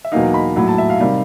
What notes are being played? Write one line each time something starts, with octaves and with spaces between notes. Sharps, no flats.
E5
E2 B2 F#3 A#3 D#4 F5
B5
A#1 A2 F#3
A5
E5
F5
C3 D#3 G3